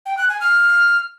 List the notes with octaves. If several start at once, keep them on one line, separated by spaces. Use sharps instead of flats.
G5
F#6
G#5
F6